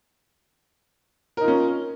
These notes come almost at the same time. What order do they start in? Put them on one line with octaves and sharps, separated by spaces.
A#4 D#4 F4 C#4